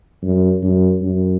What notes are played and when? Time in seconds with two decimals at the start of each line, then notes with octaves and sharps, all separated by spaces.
0.23 F#2
0.63 F#2
1.02 F#2